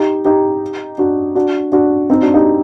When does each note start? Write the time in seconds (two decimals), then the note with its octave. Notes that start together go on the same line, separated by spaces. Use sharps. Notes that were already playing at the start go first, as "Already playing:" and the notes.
Already playing: D#4 G4
0.25 D#4 G4
0.98 D4 F#4
1.35 D4 F#4
1.72 D4 F#4
2.10 C4 D#4
2.22 D4 F#4
2.34 D#4 G4